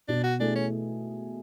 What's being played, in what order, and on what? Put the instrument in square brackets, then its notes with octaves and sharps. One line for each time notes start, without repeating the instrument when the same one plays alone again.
[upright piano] B2 [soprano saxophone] D4
[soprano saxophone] F#4
[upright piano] A3 E4 G#4 [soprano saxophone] D4
[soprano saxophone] C#4